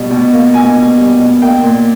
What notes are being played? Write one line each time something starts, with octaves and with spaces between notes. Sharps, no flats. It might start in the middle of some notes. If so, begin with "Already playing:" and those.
Already playing: B2 G3
B2
A#3
B2 G#5
B2
G3
B2
A#3 G5
A#2